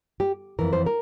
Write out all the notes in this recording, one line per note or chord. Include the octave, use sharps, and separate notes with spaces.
G4
F2 E3 A#4
C5
A#4